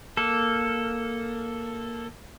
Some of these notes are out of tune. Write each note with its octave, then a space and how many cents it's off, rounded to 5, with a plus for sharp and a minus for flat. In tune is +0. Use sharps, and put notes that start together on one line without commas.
A#3 +0 A4 +0